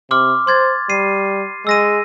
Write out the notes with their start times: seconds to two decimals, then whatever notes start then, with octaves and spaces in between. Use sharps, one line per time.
0.11 C3 C6 D6 F6
0.47 C5 C6 G#6 A6
0.90 G3 C7 D#7
1.67 G#3 E6 A#6 D#7